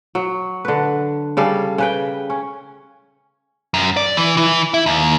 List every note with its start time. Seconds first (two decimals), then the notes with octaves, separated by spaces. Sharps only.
0.15 F#3
0.65 D3 B4
1.37 C#3 G3 A4 F5
1.78 C#3 B4 G5
2.30 C#4
3.74 F#2
3.97 D5
4.17 E3
4.37 E3
4.74 E4
4.86 D#2